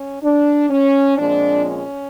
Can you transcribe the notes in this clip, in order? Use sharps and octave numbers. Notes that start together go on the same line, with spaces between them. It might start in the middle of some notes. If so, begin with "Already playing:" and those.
Already playing: C#4
D4
C#4
A#2 F3 G#3 C4 D4
C#4